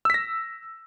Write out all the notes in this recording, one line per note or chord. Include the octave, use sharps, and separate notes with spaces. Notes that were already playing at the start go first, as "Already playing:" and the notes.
E6 A#6 B6